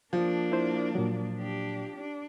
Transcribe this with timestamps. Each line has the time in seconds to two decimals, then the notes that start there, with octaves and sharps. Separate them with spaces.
0.13 F3 A#3 D4
0.52 E4 C5
0.95 A#2 F#3
1.38 D4 G4
1.97 D4